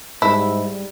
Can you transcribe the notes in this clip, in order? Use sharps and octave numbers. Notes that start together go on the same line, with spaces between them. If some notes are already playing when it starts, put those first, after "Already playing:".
G#2 G3 E4